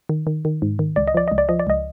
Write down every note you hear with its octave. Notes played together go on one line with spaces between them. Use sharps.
D#3
D#3
D#3
G#2
D#3
C#2 D5
D#5
F3 D5
C#2 D#5
D5
F3 D#5
D5
C#2 D#5